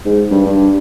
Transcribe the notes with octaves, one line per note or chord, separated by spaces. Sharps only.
G#2
G2
G2